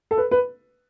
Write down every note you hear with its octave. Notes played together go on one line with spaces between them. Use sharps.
A4
B4
B4